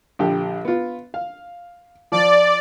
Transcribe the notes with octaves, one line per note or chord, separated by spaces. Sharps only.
A#1 D3 G4
B3 F4
F5
F3 D5